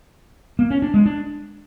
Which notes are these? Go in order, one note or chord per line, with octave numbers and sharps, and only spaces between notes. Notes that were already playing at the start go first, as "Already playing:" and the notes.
A#3
C#4
D4
G#3
D4